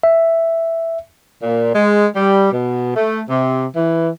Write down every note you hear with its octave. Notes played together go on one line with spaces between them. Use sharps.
E5
A#2
G#3
G3
B2
A3
C3
E3